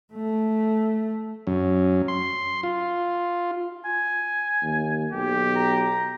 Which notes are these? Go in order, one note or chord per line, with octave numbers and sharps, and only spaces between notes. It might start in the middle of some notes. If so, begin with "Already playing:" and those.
A3
F#2
C6
F4
G#5
D#2
B1 G4
A#5